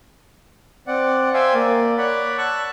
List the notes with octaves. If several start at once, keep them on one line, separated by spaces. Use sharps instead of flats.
C4 D5 F#5
C5 E5 F5 G5 G#5
A#3 D5
C#5 D5 F#5 B5
A5 C#6 E6 F#6